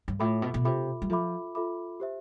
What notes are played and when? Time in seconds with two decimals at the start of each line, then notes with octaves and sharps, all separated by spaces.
0.08 G2
0.19 A2 F4 A4 E5 B5 D6
0.42 B2
0.54 B2
0.64 C3 F4 A4 E5 B5 D6
1.02 G3
1.10 F3 F4 A4 E5 B5 D6
1.55 F4 A4 E5 B5 D6
2.00 G4 C5 E5